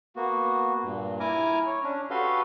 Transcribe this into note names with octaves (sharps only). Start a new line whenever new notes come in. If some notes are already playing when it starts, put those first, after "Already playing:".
A#3 B3 F#4
G2 A#2
E4 G#5 A#5 D6 F6
C#5
C#4 D4
F#4 G4 A4 B4 F5 C6